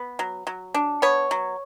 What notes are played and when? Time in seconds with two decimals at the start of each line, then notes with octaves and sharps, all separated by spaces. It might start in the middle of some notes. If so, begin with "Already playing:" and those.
Already playing: B3
0.19 F#3
0.47 F#3
0.74 D4
1.02 B3 C#5
1.31 F#3